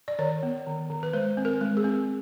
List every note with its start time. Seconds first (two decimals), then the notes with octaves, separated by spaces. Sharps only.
0.08 D5
0.19 D#3 C#5
0.43 B3
0.67 D#3
0.90 D#3
1.03 B4
1.13 G#3 C5
1.37 C4
1.45 A#4
1.61 G#3
1.77 G#4
1.84 C4